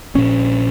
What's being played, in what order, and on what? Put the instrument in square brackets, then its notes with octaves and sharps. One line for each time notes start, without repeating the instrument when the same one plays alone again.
[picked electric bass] A#1 A#2 C#4